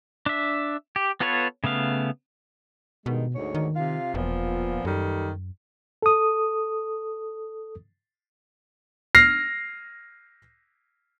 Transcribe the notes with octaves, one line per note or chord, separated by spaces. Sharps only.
D4 E5
G4
B3 F4 A4 B4 C#5
C#3 A3 B3 F5
G2 B2 D#3 G#3
D2 G#2 C#5
D#3
C3 F4 F5
E1 A#2 F3 B3
F#2 D#3 G3 A4
A4 D#6
F6 A#6 C7